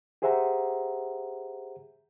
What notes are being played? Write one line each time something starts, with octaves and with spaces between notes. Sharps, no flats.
G4 G#4 C5 E5 F#5 A#5